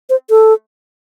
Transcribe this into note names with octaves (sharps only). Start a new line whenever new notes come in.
C5
A4